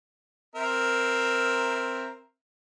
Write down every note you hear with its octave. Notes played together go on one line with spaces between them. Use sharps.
C4 A#4 E5